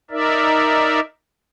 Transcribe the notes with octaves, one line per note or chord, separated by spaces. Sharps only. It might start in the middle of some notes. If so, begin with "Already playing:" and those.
D#4 A#4 D5 E5